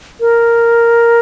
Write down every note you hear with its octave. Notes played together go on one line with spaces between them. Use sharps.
A#4